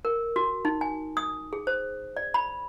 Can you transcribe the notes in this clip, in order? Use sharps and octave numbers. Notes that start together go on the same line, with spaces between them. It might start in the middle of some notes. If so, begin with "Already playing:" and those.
A#4
F#4
D#4
G#5
D#6
G#4
C5
D5
B5